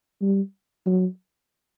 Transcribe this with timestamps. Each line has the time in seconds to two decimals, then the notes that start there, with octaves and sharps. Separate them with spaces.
0.21 G3
0.86 F#3